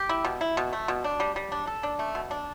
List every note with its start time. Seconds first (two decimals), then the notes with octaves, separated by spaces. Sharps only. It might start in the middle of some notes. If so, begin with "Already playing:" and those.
Already playing: G4
0.09 E4
0.24 B2
0.41 E4
0.57 B2
0.73 A3
0.88 B2
1.04 D4
1.20 G3
1.36 G3
1.52 D4
1.67 A4
1.83 D4
1.99 A3
2.15 B2
2.31 D4